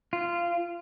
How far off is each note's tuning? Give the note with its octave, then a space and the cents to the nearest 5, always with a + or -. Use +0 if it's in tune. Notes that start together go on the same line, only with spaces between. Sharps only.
F4 -15